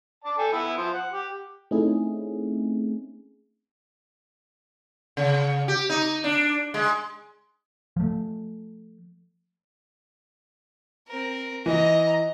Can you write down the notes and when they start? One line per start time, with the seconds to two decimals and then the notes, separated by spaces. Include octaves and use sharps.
0.25 D5 A5
0.38 A4 G5 G#5
0.53 B3 E4 E5
0.77 F3 C5
0.94 F#5
1.13 G4
1.71 A3 C4 C#4 D#4 E4 G#4
5.17 C#3
5.68 G4
5.90 D#4
6.24 D4
6.74 G#3
7.97 F3 A3
11.08 C4 A#4
11.66 E3 D#5 A#5